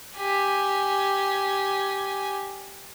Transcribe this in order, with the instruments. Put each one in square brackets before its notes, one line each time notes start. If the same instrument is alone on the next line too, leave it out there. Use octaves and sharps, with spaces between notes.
[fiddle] G4 G#5